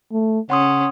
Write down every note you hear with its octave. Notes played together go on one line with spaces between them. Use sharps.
A3
C#3 C#4 F#5 C6 D#6